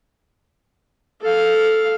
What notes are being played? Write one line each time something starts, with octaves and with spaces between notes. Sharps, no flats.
A4 F5